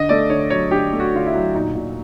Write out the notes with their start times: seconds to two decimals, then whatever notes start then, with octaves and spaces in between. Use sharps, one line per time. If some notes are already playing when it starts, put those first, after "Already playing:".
Already playing: D3 D#5
0.09 A3 D5
0.30 D3 C#5
0.50 F#3 C#5
0.71 D3 G4
0.93 A3
1.00 F#4
1.14 D3 F4
1.26 E4
1.34 F#3
1.55 A#2 D#4
1.75 A#2